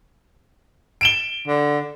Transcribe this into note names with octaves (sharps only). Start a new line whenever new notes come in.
D7 E7 G7
D3